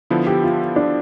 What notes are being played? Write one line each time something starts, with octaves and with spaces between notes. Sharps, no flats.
D3 F3 B3 E4
G4
F4
D4